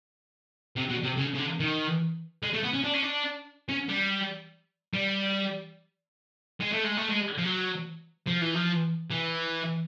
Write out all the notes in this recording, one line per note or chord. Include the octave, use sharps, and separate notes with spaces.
C3
B2
C3
C#3
C#3
D3
D#3
G#3
A3
B3
C#4
D4
C#4
D4
C#4
G3
G3
G#3
A3
G#3
A3
G#3
F3
F#3
F3
E3
F3
E3